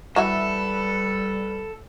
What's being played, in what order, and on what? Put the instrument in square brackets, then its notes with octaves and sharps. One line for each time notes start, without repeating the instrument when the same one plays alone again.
[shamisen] E3 F#4 E5 [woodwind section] G3 [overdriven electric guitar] A4 [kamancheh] B4